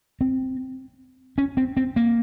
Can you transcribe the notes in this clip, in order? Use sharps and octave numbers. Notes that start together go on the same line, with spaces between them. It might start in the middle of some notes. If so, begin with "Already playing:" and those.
C4
C#4
C4
C4
A#3